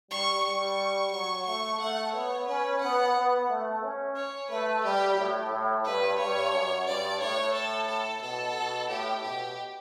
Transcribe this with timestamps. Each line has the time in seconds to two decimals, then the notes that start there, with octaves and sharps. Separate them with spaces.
0.10 G3 C#6
0.44 G3 C#6
1.12 F#3 C#6
1.46 A3 C#6
1.80 A3 F#5
2.13 B3 C#5
2.47 C#4 B4
2.81 B3 F#5
3.15 B3
3.49 A3
3.82 C#4
4.16 C#5
4.49 A3 B4
4.84 G3 G4
5.17 A2
5.51 A2
5.85 G2 B4
6.18 G2 C#5
6.53 F#2
6.87 G2 D5
7.20 A2 C#5
7.54 A4
7.88 A4
8.22 B2 A4
8.56 B2
8.89 A2 G4
9.23 B2 G4